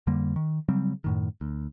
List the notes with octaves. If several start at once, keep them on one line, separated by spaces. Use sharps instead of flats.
F2 D3 G3 A#3
D#3
C#3 F#3 G3 C4
F#2 A2 D#3
D2